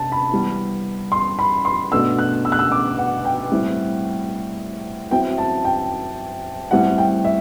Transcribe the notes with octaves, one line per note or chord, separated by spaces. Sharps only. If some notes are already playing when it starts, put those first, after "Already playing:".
Already playing: C3 D4 A5
B5
E3 G3 B3
C6
B5
C6
B2 A3 D4 E6
F#6
E6
F#6
E6
D6
F#5
G5
A2 G3 C4 E4
F#3 C4 E4 G5
A5
G5
A2 G3 C4 E4 F#5
G5
E5